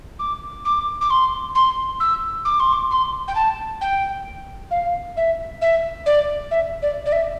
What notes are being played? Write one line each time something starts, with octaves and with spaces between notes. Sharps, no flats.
D6
D6
D6
C6
C6
E6
D6
C6
D6
C6
G5
A5
G5
F5
E5
E5
D5
E5
D5
D5
E5